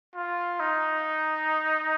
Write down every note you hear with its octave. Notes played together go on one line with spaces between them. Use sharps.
F4
D#4